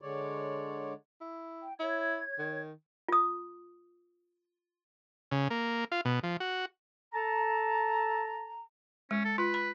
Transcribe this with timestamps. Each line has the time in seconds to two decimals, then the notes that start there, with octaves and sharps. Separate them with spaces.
0.01 D3 G#3 C#5 D5
1.21 E4
1.62 G5
1.80 E4 C#5 G#6
2.39 D#3
3.08 F4 D#6
5.32 C#3
5.50 A#3
5.92 F4
6.05 B2
6.23 F3
6.40 F#4
7.14 A4 A5 A#5
9.11 G#3 C#4
9.25 A4
9.38 F4 B4
9.54 B5